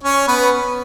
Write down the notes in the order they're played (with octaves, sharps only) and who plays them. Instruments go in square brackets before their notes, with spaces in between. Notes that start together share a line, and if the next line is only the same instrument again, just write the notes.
[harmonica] C#4 C#5
B3 B4